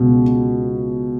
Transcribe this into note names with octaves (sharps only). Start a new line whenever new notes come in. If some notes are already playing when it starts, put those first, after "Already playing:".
Already playing: C#2 B2